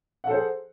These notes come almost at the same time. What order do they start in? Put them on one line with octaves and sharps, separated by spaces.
F#5 A4 C5 G#4